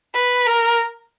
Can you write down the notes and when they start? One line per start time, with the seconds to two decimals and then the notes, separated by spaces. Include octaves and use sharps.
0.14 B4
0.46 A#4